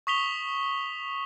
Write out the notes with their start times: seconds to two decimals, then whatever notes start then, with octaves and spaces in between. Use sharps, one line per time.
0.07 C#6 D#6 B6 F7 G7